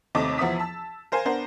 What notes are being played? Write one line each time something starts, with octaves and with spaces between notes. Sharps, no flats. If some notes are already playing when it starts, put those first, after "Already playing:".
D#2 C3 A3 D#5 A5 D6
E2 F3 B3 E5 D#6 B6
A5 E6
A#4 C5 F5 G#5
B3 D4 A#4 C5